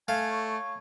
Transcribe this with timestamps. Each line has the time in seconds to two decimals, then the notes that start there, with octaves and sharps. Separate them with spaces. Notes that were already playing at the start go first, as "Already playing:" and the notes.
0.08 A3 F5 G#5
0.30 C#5